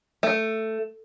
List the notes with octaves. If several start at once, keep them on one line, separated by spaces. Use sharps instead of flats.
A3